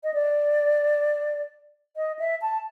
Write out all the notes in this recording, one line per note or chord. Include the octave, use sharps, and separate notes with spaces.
D#5
D5
D#5
E5
A5